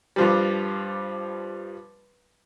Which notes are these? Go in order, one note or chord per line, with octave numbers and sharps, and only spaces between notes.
G2 F3 G3